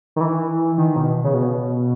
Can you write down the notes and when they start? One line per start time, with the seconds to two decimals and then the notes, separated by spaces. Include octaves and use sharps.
0.16 D#3
0.21 E3
0.78 D#3
0.96 B2
1.24 C#3
1.34 B2